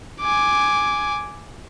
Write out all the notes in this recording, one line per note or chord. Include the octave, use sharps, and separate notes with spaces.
G#5 D6